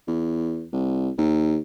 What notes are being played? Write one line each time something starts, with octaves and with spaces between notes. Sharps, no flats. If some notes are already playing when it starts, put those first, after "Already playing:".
E2
C2
D#2